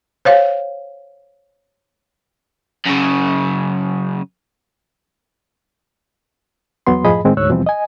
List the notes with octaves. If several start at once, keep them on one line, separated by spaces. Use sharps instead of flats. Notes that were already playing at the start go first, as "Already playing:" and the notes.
C5 C#5 F5
F#2 C#3
E2 F#3 B3 C6
F#2 A2 F3 G#4 D#5 B5
A2 D#3 G#3 C4
D2 G#2 C#5 E6 F#6
D#2 B2 E3 F3 G3 C4
D#5 G#5